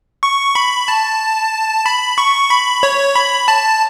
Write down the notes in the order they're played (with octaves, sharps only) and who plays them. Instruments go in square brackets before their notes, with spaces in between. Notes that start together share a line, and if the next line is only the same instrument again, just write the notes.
[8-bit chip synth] C#6
B5
A5
B5
C#6
B5
C#5
B5
A5